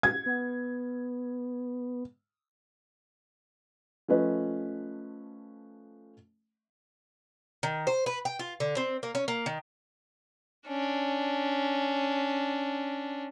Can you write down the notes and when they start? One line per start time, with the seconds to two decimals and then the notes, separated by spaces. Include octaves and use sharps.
0.03 G#6
0.26 B3
4.08 F3 A3 C#4 B4 D#5
7.63 D#3
7.87 C5
8.06 B4
8.25 G5
8.39 F4
8.60 D3
8.77 C4
9.03 A#3
9.15 C#4
9.28 A#3
9.46 D#3
10.68 C#4 D4